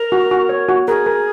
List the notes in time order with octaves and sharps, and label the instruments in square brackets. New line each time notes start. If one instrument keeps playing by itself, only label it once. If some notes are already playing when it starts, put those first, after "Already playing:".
Already playing: [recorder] A#4
[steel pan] F#4
F#4
C#5
F#4
[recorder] G#4 [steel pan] A#4
[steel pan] A#4